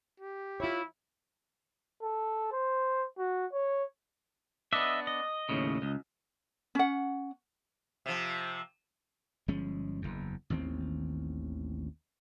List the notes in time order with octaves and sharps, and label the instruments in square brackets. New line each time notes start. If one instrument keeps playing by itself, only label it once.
[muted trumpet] G4
[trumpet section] E4 [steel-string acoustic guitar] F4 C#5
[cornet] A4
C5
F#4
C#5
[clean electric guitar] B3 D4 [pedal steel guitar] D#5 E5
[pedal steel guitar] D#5
[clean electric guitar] D#2 A2 C#3
C#2
[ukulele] C#4 F#5
[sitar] C3 F3
[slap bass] G1 F3 G#3 C#4
F#1 E2
A1 D#2 D#3 C4